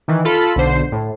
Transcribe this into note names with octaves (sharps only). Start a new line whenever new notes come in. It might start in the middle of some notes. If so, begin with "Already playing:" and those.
D#3 E3
F4 A4 B5
B1 D3 C5 C7
A2